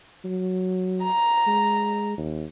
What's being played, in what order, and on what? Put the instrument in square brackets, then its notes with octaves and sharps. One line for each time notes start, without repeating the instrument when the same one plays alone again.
[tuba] F#3
[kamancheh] A#5
[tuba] G#3
D#2